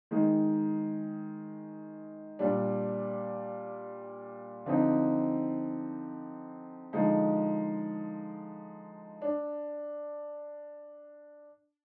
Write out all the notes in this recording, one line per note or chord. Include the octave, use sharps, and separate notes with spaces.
D#3 G#3 D#4
A#2 G3 D4
D3 F3 C4 D#4
D3 F3 G#3 D#4
D4